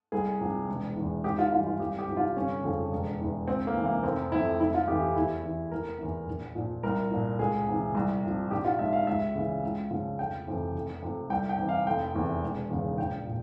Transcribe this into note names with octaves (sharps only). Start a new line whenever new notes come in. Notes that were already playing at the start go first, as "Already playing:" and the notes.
C2 G#4
C3 F3
E1
E2 E3
G#1 G4
F4
G2 E3 F4
F4
C2 G4
G4
C3 F3
F4
G1 C#4
F2 C#3 F3
E1
E2 E3
C#2 C4
A#3
C3 E3
A#3
F1 C4
F2 C3 E4
F1 E4
F4
F2 E3 G4
G4
E2 E4
E3
F1 A#4
E2 E3
A#1
A#2 F3
C2 A#4
A#2 F3
C#2 G#4
C3 E3
C2
C3 F3
A#1 G4
F4
G#2 F3 E5
F5
C#2 E5
C#3 E3
C#2
C#3 F3
F1 G5
F2 C3 E3
F1
F2 C3 F3
C2 G5
G5
C3 E3
F5
F1 G5
E2 C3 E3
E1
E2 C#3
A#1 G5
A#2